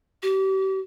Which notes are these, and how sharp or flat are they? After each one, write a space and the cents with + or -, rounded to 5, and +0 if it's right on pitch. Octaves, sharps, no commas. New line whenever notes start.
G4 -35